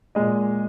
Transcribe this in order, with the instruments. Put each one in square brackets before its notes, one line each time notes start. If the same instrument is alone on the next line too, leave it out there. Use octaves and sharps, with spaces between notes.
[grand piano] A#2 G#3 D#5